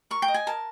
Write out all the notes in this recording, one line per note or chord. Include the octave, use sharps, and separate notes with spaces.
A#4 C#6
G5
D#5
G#5
A#4 A5